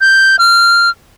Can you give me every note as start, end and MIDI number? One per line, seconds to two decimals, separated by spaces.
0.01 0.36 91
0.39 0.90 89